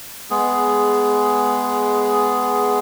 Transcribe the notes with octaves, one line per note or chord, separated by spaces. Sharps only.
G#3 B3 G#4